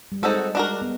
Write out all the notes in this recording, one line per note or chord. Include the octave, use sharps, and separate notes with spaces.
G3
G#3 C4 D#4 F#4 A4
D4 F#4 A#4
B3